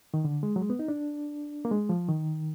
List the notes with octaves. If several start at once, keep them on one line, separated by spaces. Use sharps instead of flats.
D#3
D3
G#3
F#3
G#3
B3
D#4
D4
A#3
G#3
F3
D#3